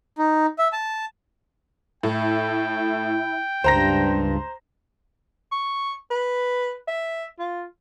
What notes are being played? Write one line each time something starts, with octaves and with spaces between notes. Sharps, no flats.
D#4
E5
A5
A2 E4 G5
C#2 G2 C5 A#5 A#6
C#6
B4
E5
F4